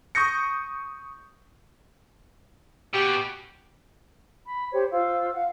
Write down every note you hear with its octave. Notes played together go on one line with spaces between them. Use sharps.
C#6 D#6 G6 A#6 C#7
B2 G4
B5
G4 C5 C#5
F4 C5 F5 E6
F5 F#5